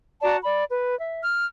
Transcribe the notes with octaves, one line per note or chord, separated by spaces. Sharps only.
F#4 D5 A5 A#5
D5 B5
B4
E5
F6